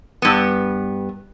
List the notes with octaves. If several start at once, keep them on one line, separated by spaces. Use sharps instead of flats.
G2 B3